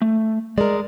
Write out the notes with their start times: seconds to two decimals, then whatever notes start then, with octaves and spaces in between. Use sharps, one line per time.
0.02 A3
0.58 G#3 A#4 D5